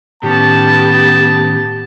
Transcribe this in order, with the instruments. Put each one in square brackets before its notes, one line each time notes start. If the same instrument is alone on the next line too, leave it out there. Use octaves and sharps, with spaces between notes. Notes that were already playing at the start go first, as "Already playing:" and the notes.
[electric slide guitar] A2 D#3 C#4 [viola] B3 G4 [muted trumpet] A5